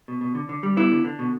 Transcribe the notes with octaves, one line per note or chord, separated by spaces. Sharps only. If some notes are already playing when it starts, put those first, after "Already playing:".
B2
B2
D3
D3
G3
B3 E4
D3
D3
B2